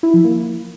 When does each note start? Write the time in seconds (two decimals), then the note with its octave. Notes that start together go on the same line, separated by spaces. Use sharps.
0.03 E4
0.14 F3
0.24 A#3